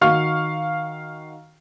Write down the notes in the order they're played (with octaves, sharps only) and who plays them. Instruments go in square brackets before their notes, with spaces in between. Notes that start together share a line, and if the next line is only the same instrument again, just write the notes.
[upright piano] D#3 F#4 F5 C#6 F6